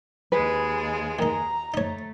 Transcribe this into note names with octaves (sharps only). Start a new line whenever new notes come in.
D#2 G#3 G#4 B4
D#3 D#4 A#5
A3 D#4 C#5